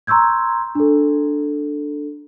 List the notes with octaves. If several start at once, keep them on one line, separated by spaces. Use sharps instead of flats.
A#5 C6 C#6 E6 G6 G#6
D4 A4